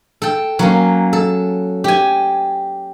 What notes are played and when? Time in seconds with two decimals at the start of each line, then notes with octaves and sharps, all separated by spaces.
0.22 A4 G5
0.59 F#3 A#3 C#4
1.13 A4
1.84 G4 G#5